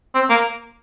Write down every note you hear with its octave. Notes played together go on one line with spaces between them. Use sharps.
C4
A#3